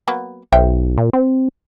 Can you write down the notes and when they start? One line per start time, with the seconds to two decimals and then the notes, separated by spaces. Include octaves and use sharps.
0.08 F#3 A#3 B3
0.52 B1 C5 E5 G5
0.98 A#2
1.13 C4